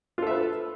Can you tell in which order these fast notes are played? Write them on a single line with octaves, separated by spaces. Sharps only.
F4 A4 E5 B4